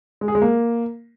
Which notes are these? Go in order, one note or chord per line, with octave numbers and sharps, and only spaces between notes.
G#3
G#4
G#3
A#3